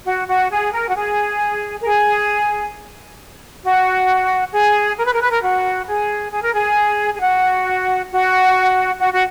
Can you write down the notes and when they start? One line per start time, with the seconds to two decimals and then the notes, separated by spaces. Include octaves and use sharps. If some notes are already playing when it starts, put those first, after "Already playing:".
0.05 F#4
0.27 F#4
0.51 G#4
0.73 A#4
0.89 F#4
0.95 G#4
1.81 A#4
1.84 G#4
3.63 F#4
4.53 G#4
4.98 A#4
5.05 B4
5.13 A#4
5.22 B4
5.30 A#4
5.42 F#4
5.87 G#4
6.31 G#4
6.43 A#4
6.54 G#4
7.15 G#4
7.21 F#4
8.11 F#4
9.00 F#4
9.13 F#4